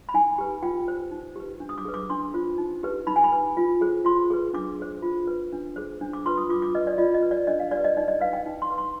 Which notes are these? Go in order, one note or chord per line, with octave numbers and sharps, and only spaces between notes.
B5
D#4 G#5
G4 B4
F4 G5
C5
D#4
G4 B4
D4
D#6
D6
G#4 B4
D6
D4 C6
F4 C5
D#4
G4 B4
D#4 B5
G#5
B5
B4
F4
G#4 C5
F4 C6
G#4 B4
D4 D6
G#4 C5
F4
B4
D4
G#4 C5
D4
D6
F4 B4 C6
D#6
F4 D6
D6
B4 D#5
D5
F4 D#5
D#5
B4
D5
D4 D#5
F5
G4 D5
B4
D#5
D#4 D5
D#5
B4 F5
G5
D#4
C6
B4
C6